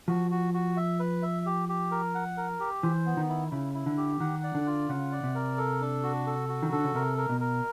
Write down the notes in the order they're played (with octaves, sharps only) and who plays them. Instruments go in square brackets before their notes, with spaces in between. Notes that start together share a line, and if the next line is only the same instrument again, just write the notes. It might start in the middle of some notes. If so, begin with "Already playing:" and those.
[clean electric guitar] F3 [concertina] F#4
[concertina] F#4
F#4
E5
B4
E5
G4
G4
A#4
F#5
A#4
G4
[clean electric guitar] E3 [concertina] C5
[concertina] B3
[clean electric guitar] D#3
[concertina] E4
[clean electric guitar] C#3 [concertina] E4
[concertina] E4
[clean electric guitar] D3
[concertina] G4
[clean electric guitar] D#3 [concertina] F#5
[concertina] D5
[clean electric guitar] D3
[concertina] F4
[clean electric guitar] C#3 [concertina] F#5
[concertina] D5
[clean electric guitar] C3
[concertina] A#4
A4
D4
F#4
A4
F#4
[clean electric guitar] D#3
[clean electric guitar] D3 [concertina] A4
[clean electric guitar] C#3
[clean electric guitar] C3 [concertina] A#4
[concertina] A#4
[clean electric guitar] B2
[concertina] A#4